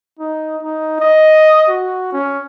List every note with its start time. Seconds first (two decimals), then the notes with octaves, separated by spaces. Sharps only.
0.19 D#4
0.63 D#4
1.00 D#5
1.69 F#4
2.12 C#4